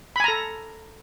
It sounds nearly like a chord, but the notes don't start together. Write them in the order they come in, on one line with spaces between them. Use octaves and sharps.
B5 G#5 A#5 A4